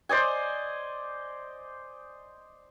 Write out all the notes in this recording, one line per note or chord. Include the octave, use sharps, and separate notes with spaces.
C5 D5 D#5 G#5